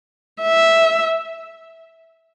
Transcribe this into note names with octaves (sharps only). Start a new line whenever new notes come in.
E5